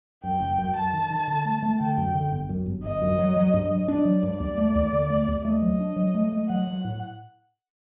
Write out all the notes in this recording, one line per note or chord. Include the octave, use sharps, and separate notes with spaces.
F#2 G5
F#1
F#2
F#2 A5
D#3
D#3
D3
A3
A3
D3 G5
F#2
D3
G1
F#2
G1
G1 D#5
F#2
F#3
F#3
G2
F#3
D4 D5
F#3
G2
D#2 D5
A3
D#2
D3
A3
D#2
A3 D#5
F#3
D4
F#3
A3
A3
F#3 F#5
F#3
A2